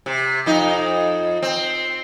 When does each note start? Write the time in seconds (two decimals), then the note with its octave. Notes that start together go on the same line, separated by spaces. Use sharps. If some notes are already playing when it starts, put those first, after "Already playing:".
0.06 C3
0.46 F2 D#4
1.43 C4